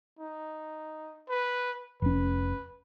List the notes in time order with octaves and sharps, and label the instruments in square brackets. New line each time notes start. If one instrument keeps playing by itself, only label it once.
[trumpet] D#4
B4
[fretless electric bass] F1 C#4 [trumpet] B4